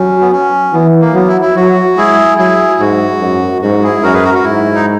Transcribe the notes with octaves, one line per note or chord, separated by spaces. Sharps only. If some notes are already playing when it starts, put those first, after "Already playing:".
Already playing: F#3 C#4
B3
C#4
E3 B3
A#3
F#3 B3
E4
E4
F#3 F#4
G#3 E4 G#4
F#3 E4 G#4
G#2 F#4
F#2
G#2 F#4
E4 G#4
F#2 F#4 A#4
G#4 B4
F#4 A#4
F#4
G#2 E4
D#4